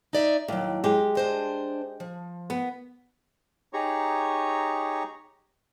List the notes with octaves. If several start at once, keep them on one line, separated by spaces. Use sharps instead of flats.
D#4 D5 E5
D#2 A2 F#3
G#3 G4
D4 C5 D#5
F3
B3
D#4 G4 G#4 C#5 A#5 C#6